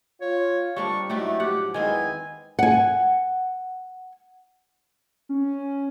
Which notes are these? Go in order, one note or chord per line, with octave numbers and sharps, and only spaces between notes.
F4 C#5
D3 G3 A#3 C4 D4 C#6
F#3 A3 D#4 E4 F#4 G4
G#2 F3 G4 F#5
E2 D#3 G#3 B3 C4 G#5
F#5 G#5
C#4